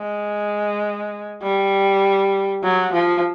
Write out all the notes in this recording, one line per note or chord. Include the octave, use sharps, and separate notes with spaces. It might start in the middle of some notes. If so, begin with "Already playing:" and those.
Already playing: G#3
G3
F#3
F3